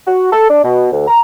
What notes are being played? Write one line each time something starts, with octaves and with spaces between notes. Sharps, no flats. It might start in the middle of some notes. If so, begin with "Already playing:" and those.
F#4
A4
D4
B2
D2
A#5